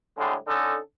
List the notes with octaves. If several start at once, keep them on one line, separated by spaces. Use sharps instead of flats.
A2 D3 G3 G#3
D3 C#4 D#4 A4